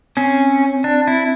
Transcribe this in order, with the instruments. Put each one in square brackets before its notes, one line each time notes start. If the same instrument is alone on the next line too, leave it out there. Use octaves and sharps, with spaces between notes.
[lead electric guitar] C4 [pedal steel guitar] C#4
[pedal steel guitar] D4
E4